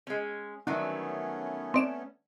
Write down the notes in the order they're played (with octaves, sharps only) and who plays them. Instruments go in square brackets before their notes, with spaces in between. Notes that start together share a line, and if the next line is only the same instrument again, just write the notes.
[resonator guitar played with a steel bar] G#3 C#4
[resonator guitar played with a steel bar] D#3 F#3 E4 [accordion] A3 B3 C#4 [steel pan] D4
[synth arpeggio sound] C4 D5 E7